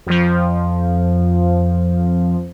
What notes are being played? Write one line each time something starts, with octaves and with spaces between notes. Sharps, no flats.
F2 F3